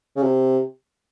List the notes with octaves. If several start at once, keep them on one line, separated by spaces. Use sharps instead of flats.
C#3
C3